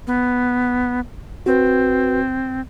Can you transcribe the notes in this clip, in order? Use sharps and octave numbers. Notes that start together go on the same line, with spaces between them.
B3
C4 F#4 B4